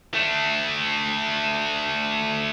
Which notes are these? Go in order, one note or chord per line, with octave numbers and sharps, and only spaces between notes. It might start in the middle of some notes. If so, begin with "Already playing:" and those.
A3 D4